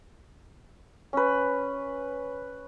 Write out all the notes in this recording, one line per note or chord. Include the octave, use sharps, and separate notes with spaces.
C#4 B4